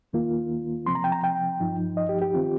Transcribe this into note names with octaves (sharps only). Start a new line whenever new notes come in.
D#2 D#3 A#3 F4
C3 F3 C4 C6
A#5
G5
A#5
G5
G2 F3 D#4
D#5
G4
G4
D#3 C4 F4